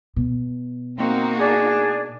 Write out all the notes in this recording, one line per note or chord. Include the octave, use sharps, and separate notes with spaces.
B2
A#3 C4 D#4 F#4
D4 G#4